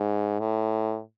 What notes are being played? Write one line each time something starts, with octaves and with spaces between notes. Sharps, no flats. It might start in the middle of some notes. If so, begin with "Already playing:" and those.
Already playing: G#2
A2